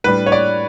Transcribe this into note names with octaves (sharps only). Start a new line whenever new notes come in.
A2 G3 D4 B4
C#5
D5